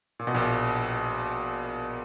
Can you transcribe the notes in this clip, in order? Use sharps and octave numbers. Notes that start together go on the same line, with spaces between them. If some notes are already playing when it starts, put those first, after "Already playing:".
A#2
B2
A#1 A#2